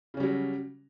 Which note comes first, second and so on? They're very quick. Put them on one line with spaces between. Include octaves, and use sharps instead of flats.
C#3 C#4 G3 F#3